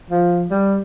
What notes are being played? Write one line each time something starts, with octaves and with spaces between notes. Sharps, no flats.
F3
G3